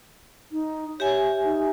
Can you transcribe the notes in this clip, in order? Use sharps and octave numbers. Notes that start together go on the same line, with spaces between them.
D#4
G4 C#5 E5 G#5
D#4